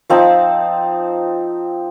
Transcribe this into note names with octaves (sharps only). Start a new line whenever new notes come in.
F3 C4 D#4 A5